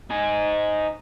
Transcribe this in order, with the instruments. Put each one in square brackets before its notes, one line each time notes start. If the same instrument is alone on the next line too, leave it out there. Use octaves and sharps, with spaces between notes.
[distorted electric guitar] D#4 G#5